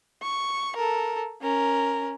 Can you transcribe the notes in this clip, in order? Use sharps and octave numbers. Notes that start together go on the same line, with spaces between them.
C#6
A4 A#4
C#4 A#4